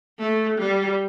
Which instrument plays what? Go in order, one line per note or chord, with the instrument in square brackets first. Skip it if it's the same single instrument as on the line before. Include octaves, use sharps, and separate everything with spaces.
[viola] A3
G3